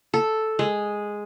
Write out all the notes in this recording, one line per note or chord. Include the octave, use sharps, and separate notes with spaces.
A4
G#3